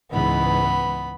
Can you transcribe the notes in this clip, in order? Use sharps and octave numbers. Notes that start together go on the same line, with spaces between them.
C#2 G#2 E3 B3 B5